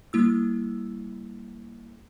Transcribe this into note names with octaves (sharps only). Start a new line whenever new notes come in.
G3 A#3 E4 E6